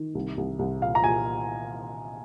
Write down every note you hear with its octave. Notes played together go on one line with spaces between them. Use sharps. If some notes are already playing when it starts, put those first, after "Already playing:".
Already playing: D#3
C2
C2
C2
A#2 F5
A#5
A#2 G#5